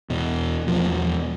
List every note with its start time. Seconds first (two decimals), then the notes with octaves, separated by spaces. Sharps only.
0.10 E2 B2
0.67 E2 B2 F3